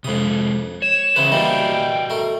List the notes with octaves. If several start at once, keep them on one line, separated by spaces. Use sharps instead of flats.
F2 C3 G#3 D#6
C#5 E7
C#2 E3 C#4 B4 C5
E3 G3 A#3 F#4 D5 D#5 G5
A3 A#4